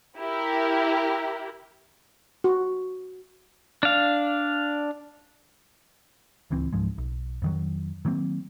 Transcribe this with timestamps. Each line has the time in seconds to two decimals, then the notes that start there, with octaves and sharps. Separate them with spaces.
0.18 E4 G4 A#4
2.44 F#4
3.83 D4 F5
6.50 D1 C#2 E3 C4
6.73 C#2 G#2 F3 G#3
6.98 B1
7.42 F2 D#3 F#3
8.05 D#3 F#3 A#3 C4